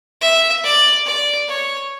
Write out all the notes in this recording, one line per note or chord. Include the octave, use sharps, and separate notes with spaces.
E5
D5
D5
C#5